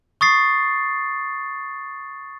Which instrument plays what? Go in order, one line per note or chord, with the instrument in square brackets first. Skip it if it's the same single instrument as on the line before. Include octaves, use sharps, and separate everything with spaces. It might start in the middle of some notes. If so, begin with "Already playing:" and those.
[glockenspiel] C#6 D#6 A6 C7